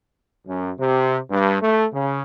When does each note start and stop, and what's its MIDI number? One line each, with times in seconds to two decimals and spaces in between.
0.46 0.70 42
0.78 1.17 48
1.29 1.58 43
1.60 1.84 57
1.91 2.21 49